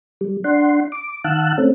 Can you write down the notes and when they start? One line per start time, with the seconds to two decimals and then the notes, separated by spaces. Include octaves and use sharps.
0.21 G3
0.44 D4 F#5 C6
0.92 D6
1.24 D#3 F5 F#5 A5 E6 F#6
1.58 A3 C4 C#4